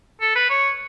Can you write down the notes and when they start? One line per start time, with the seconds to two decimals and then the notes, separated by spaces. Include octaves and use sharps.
0.21 A4
0.35 B4
0.50 C#5